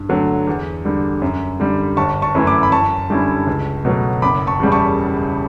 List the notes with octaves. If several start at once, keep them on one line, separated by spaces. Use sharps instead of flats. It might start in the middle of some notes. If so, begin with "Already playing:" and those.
Already playing: G2
D3 F#3 A3
E2
D3 G3
F#2
D3 G3
G1 A5 C#6
A5 C#6
F#2 E3 A3 E4
B5 D6
B5
F#2 A5 C#6
D3 G3 C#4 E4
C#2
B2 F#3 A3
F#1 B5 D6
A5 C#6
E2 C#3 G3
A5 C#6